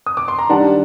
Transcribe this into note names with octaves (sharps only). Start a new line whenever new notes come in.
D#6
D6
C6
A#5
D#3 G3 D4 F#5 A5